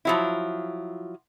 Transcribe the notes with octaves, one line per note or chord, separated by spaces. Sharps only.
F3 F#3 E4